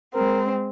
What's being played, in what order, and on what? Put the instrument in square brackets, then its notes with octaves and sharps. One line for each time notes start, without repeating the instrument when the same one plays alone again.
[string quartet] G#3 C4 [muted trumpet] A#4